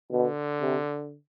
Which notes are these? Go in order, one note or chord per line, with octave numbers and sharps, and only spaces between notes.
B2 D3
C3